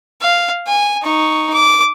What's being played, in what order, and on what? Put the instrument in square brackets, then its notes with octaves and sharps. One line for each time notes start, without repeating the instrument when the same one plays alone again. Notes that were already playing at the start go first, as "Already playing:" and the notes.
[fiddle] F5
G#5
D#4 C#6
D6